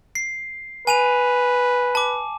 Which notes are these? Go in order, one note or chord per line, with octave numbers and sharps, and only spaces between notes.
C7
B4 G#5 D#7 F7
A5 D6